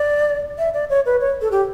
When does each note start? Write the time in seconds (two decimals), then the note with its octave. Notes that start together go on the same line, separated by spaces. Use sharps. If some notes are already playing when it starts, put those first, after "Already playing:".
Already playing: D5
0.58 E5
0.74 D5
0.90 C#5
1.06 B4
1.21 C#5
1.41 A4
1.51 G4